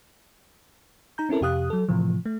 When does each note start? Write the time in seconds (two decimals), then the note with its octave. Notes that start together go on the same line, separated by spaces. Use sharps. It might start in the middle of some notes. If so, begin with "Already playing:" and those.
1.18 D#4 A#5 G6
1.29 C4 C#4 E4 A4 A#4
1.41 F2 C3 G4 F5 D#6 F#6
1.70 F#3 A4
1.89 A2 C3 E3 F3
2.26 A3